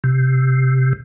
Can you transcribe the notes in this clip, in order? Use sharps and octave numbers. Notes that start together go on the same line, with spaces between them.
C3